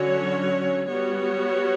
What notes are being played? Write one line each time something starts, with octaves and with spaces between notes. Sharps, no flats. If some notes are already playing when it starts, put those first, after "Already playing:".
Already playing: D3 F#3 C#4 F#4 C#5
G3 B3 F#4 C#5